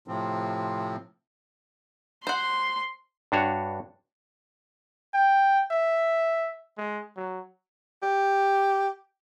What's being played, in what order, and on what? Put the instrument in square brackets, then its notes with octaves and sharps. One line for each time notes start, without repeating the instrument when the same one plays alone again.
[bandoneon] A2 C3 F3 C4
[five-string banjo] C5 F#5 [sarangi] C6
[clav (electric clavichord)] G2 D4 F#4 C#5
[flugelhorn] G5
E5
G#3
F#3
[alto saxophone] G4